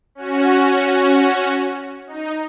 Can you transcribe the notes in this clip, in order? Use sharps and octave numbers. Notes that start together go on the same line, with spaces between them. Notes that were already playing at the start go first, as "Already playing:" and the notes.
C#4 F#4
D#4